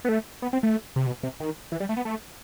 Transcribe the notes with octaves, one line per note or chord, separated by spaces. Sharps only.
B3
A3
B3
C4
A3
C3
B2
C3
D#3
E3
G3
A3
B3
A3